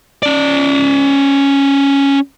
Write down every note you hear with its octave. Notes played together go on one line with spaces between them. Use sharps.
C#4 D5